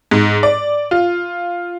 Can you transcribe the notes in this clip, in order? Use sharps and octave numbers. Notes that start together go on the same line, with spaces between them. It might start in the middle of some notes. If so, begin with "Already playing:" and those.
G#2
D5
F4